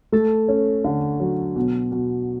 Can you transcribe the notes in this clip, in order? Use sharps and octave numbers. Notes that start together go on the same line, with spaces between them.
A3 A4
C#4
D3
F#3
B2
B2